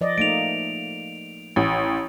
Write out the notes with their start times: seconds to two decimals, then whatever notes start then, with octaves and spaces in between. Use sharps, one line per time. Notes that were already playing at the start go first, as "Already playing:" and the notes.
0.01 F3 D5 D#5
0.18 A3 A#3 D#4 D7 F7
1.56 A1